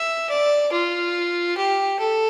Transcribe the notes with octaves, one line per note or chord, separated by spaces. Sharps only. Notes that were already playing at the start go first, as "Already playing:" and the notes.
Already playing: E5
D5
F4
G4
A4